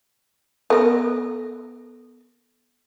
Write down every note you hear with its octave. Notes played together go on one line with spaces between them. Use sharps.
B3 A4 A#4 E6